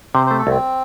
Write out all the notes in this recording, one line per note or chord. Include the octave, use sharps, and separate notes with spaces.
C3 C5
A3 C5
A4
C2 C4